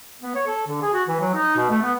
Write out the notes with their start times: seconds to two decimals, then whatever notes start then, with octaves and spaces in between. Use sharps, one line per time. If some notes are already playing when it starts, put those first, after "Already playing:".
0.22 B3
0.35 C#5
0.47 A4
0.67 D3
0.81 G#4
0.93 F#4
1.08 E3
1.20 F#3
1.34 D#4
1.56 B2
1.70 A3
1.82 B3